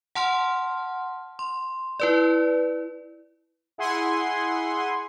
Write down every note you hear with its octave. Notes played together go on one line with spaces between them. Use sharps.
F#5 A5 C6 F6
C6
E4 B4 D5
E4 G#4 F#5 G#5 C6